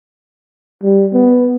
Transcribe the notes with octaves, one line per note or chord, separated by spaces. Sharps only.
G3
B3